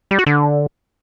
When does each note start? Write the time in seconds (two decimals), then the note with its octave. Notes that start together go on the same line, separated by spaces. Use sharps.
0.11 G3
0.19 F#4
0.26 D3